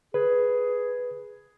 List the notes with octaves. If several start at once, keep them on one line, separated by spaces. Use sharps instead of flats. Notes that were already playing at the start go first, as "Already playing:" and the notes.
G#4 B4